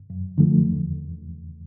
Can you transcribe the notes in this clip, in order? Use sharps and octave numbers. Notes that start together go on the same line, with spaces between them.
F#2
D3 F3 A3
E2